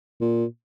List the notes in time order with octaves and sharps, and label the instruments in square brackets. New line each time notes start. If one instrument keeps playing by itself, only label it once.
[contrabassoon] A#2